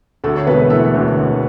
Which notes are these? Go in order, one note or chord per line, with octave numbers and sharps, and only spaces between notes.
D2 A3 A4
C#5
E1 B3 B4
E3 A3 A4
D2
D2